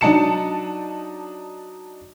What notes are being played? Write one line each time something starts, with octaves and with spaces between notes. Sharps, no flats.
F#3 D4 D#4 A5 C#7 E7